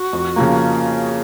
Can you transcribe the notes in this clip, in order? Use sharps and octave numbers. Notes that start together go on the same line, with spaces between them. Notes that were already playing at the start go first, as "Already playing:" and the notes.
Already playing: F#4
F2
C#3 F3 A#3